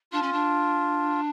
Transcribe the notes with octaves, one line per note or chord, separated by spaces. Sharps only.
D4 F4
C#4
D4